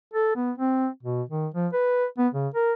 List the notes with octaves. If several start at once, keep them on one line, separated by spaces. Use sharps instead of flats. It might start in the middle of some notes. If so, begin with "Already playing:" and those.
A4
B3
C4
B2
D#3
F3
B4
B3
C#3
A#4